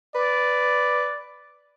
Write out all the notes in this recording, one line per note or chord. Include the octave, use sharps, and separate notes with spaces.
B4 D5